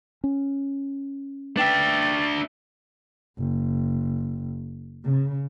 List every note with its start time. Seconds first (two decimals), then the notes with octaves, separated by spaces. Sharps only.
0.24 C#4
1.57 D4 B4 E5 G5 A6 B6
3.39 F#1
5.04 C#3